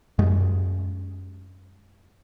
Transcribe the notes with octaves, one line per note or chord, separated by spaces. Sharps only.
F#2 G#3